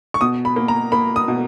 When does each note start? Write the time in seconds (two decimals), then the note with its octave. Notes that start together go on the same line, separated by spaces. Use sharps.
0.14 C#6
0.21 B2 D#6
0.45 B5
0.56 A#3
0.68 A#5
0.92 A#3 B5
1.16 D#6
1.28 B2